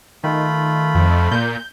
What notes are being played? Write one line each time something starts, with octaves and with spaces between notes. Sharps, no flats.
D#3 A3 F4 B5
F2
A#2 G6